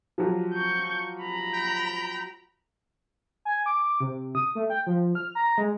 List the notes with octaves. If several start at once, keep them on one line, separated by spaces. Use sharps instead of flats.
F3 F#3 G4
C#6 G6
A#5 B5
G5
G#5
D6
C3
D#6
A3
G5
F3
F6
A#5
G#3